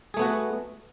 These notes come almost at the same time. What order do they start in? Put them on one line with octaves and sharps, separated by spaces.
G#4 A3 B3 F#4